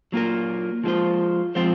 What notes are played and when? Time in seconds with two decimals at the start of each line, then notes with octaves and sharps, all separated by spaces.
0.12 F#3 A#3 F4 A#4
0.84 F3 G#3 C4 F4 C5
1.55 F3 G#3 C4 F4 C5